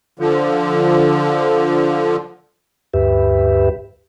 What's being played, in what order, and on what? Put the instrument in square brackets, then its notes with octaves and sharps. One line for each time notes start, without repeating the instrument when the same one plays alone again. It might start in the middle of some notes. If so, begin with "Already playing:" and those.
[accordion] D3 F3
[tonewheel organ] D2 G2 G4 B4 E5